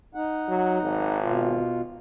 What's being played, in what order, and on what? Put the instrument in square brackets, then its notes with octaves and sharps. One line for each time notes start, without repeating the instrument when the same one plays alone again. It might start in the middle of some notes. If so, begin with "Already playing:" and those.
[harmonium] D#4 F#5
[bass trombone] F#3
G#1
[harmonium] B2 F4